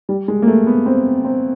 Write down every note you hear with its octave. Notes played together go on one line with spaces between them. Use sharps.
G3
G#3
A#3
A3
B3
C4
C4